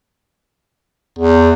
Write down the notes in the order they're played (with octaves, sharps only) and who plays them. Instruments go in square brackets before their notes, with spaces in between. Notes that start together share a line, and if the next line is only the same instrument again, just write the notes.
[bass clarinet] E2